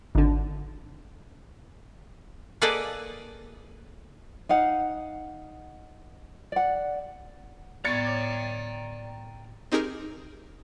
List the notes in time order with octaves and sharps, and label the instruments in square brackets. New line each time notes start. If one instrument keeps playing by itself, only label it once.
[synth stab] G#1 D3
[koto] A#3 G#4 A4 B4 D5 D#5
[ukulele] D#4 F5 F#5
D5 F#5
[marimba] A2 B3 [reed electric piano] D5 [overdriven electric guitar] G5 A#5 [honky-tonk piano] G#6 A6 C#7
[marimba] C#5 D6
[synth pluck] C4 D#4 G4 G#4 A#4